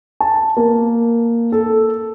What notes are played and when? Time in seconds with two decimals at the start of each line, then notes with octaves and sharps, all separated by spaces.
0.20 A5
0.57 A#3
1.52 A4